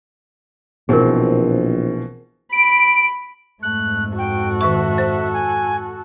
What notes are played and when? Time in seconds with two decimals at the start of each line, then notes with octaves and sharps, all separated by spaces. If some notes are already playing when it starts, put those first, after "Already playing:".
0.89 A#1 B2 E3 C4 G#4 A#4
2.52 B5 D7
3.62 F2 G#2 A3 F#6
4.18 F#4 A4 G5
4.61 D#3 E5 C#6
4.98 C5
5.33 G#5